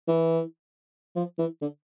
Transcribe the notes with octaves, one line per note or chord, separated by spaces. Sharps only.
E3
F3
E3
D3